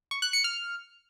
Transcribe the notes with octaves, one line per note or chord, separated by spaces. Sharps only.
C#6
F#6
C#7
F6